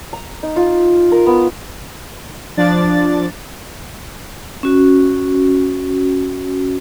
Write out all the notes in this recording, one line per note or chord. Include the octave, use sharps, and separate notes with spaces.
A#5
D#4
F4
A#4
B3
F3 D4 D5 A6
C#4 F#4